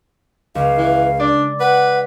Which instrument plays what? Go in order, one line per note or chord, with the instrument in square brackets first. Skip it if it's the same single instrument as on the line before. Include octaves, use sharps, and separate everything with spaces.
[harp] C#2 [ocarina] F5
[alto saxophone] E3
[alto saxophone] D4 [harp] D5
[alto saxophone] B4 [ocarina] F#5